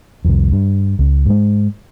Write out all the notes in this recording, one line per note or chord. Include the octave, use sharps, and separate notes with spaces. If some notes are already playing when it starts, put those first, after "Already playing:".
C2 F2
G2
C#2
G#2 G#3